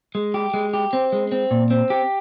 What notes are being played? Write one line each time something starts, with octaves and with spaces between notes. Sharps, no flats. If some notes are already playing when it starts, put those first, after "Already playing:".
G#3
G4
G#3
G4
C4
G#3
C4
A#2
C4
G4